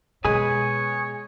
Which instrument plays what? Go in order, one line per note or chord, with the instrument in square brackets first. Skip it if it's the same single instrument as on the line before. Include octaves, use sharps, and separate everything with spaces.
[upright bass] B2 [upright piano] G#3 [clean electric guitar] G#4 B4 G#5 [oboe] C#5